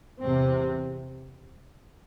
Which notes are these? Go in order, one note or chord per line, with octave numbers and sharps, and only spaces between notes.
E2 C3 C4